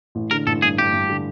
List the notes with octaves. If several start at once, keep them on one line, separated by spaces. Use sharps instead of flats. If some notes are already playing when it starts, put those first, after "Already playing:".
A1
D3 A#4
A1 A4
G2 G#4
G2 G4
G2
D3